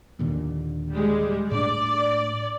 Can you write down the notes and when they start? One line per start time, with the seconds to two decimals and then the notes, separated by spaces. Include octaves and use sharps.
0.19 D#2 A#2 D3
0.90 G3 G#3
1.51 A2 D4 D5